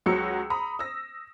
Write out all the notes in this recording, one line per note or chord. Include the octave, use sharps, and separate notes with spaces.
C#2 F#3 F#4 E6 C#7
A#5 B5 D#6
E6 A#6